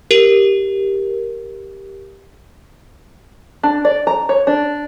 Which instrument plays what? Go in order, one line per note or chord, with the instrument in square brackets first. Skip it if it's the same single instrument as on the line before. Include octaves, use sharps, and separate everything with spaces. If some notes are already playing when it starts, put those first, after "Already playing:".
[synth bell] G4 A#4
[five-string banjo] D4
D5
A#5
C#5
D4